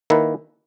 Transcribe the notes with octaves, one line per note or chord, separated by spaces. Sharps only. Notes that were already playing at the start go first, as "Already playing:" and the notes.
D#3 A#3 E4 B4